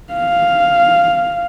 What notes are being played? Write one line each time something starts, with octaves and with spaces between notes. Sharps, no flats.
F5